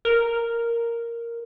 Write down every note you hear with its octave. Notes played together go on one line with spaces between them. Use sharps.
A#4